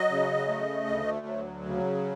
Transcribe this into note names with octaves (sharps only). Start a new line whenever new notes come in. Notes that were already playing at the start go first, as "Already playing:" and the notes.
Already playing: F#3 D#5
C#3
A3
D2
F#3
C#3